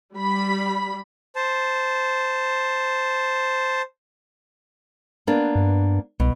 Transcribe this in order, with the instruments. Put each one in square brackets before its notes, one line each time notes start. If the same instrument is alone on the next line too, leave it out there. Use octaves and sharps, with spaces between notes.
[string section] G3 B5
[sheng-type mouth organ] C5 A5
[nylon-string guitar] A#3 B3 D4
[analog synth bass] G2
[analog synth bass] C2 [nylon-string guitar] B2